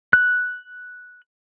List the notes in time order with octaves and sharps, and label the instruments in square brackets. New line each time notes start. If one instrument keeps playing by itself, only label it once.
[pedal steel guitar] F#6